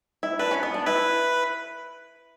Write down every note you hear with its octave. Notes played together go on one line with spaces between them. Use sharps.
E4
D4 B4
C#4
B3
D4
E4 B4